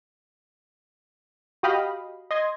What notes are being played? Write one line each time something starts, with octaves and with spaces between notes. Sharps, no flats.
F#4 G4 D#5 F5 G5 B5
D#5 C6 G#6